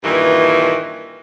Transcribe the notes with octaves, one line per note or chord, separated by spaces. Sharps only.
G2 A#2 D#3 E3